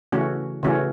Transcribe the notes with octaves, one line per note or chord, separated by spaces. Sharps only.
C#3 E3 A3 C#4 F#4
C#3 E3 A3 C#4 F#4